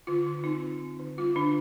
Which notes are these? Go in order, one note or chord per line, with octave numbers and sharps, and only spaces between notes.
D3 F4
D3
C4 D#4
D3
C4
D3
G3 F4
D3 D4